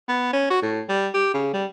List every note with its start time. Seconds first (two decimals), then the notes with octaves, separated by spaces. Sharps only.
0.08 B3
0.33 C#4
0.50 F#4
0.62 A2
0.89 G3
1.14 G4
1.34 C#3
1.53 G3